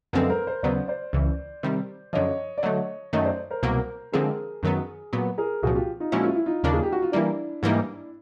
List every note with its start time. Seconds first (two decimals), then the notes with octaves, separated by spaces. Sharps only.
0.13 F#2 D3 F3 G#3 C4 A4 B4
0.30 A#4 C5
0.47 A#4 C5
0.63 D#2 C#3 F#3 B3 C5 D5
0.88 C5 D5
1.13 C#2 C#3 E3
1.63 C3 D#3 G3
2.13 F#2 D3 F3 C#5 D#5
2.58 D5
2.63 D3 F#3 A3 C#5 D#5
3.13 F#2 D#3 F#3 A3 C#5 D#5
3.25 C5 D5
3.51 A#4 C5
3.63 C2 B2 F#3 A#3
4.12 D3 F3 G#3 C4 G#4 A#4
4.63 F#2 D#3 F#3 B3
5.13 A#2 F#3 B3
5.38 G#4 A#4
5.63 C2 A#2 F3 F#4 G#4
5.75 F4 G4
6.00 D#4 F4
6.12 A#2 F3 G#3 C#4 E4 F#4
6.23 F4
6.35 E4
6.46 D#4 F4
6.63 D#2 C#3 F3 A#3 D4
6.73 G#4
6.83 G4
6.92 F#4
7.02 F4
7.12 E3 G3 A#3 D4 E4
7.63 G#2 E3 G3 A#3 D#4